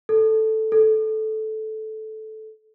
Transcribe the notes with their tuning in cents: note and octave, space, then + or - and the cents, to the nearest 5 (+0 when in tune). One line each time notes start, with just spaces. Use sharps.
A4 +0
A4 -10